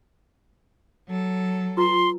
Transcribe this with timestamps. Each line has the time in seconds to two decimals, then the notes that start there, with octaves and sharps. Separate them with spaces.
1.08 F#3 A4
1.77 F4 B4 A#5 C6